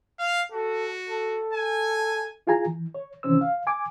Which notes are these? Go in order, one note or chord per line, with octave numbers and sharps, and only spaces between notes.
F5
F#4 A4
A4
G#5
E4 F4 G#4 G#5 A#5
E3
C#5
C3 D#3 E3 C#4 C5 E6
F5
G#5 D6